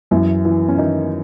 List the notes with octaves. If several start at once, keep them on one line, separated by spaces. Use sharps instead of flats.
F#2 E3 E4
E3
C#4
D#3 E3 D#4